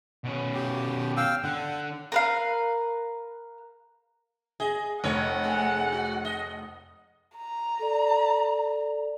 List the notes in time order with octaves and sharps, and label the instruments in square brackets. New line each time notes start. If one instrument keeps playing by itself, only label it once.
[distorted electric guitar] B2 C#4
[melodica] G4
F5 G5 E6
[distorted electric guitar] D3 [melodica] F#5
[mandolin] A#4 B4 F5
[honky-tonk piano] G#4 [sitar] D#5
[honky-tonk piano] F1 [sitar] C#5 [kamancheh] F#5
[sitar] G#3 A3
F#4
D#5
[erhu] A#5
[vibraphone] A4 D5